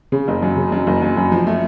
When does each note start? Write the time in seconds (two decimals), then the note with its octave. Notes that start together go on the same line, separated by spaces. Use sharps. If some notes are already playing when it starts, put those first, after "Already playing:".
0.12 C#3
0.28 F#1
0.42 F#2
0.57 C#3
0.72 F#2
0.87 F#1
1.02 F#2
1.17 F#2
1.32 F3
1.47 A3